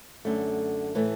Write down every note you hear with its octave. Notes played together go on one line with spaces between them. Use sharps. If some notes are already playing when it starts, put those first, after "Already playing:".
F#2 D3 A3
A2 E3 A3